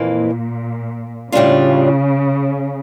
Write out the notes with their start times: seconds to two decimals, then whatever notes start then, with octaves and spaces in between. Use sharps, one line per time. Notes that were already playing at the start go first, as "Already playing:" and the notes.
Already playing: F2 A#2 E3 A#3
1.32 A2 C#3 G3 D4 F4